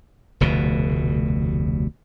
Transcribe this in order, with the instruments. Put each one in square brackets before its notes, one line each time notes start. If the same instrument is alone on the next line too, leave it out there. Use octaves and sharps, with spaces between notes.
[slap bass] F1 D2 B2